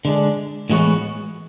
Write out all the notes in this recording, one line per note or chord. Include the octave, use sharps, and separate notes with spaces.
D3 G#3 D4
A2 E3 G#3 B3 F#4